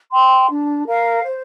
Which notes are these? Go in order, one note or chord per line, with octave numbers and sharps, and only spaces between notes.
G5 C6
D4
A#4 F5
C5